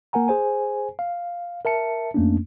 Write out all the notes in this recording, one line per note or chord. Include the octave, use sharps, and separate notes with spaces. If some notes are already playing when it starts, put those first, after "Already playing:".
A#3 A#4 F#5 G#5 A#5
G#4 C5 G#5
F5
A#4 E5 A5 C#7
F2 A3 A#3 C#4 D4